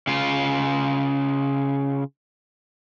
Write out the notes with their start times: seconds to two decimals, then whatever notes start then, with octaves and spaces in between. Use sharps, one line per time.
0.07 C#3 F4